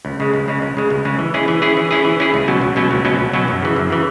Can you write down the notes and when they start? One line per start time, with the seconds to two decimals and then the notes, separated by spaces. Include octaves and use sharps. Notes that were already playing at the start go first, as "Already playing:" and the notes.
0.05 C#2
0.20 C#3 G#3
0.34 C#2
0.48 C#3 G#3
0.62 C#2
0.77 C#3 G#3
0.90 C#2
1.05 C#3 G#3
1.19 E3
1.34 C#4 E4 G#4
1.48 E3
1.62 C#4 E4 G#4
1.77 E3
1.91 C#4 E4 G#4
2.05 E3
2.20 C#4 E4 G#4
2.34 C#2
2.48 B2 F#3 C#4
2.62 C#2
2.76 B2 F#3 C#4
2.91 C#2
3.05 B2 F#3 C#4
3.19 C#2
3.33 B2 F#3 C#4
3.48 F#2
3.62 C#3 E3
3.76 F#2
3.90 C#3 E3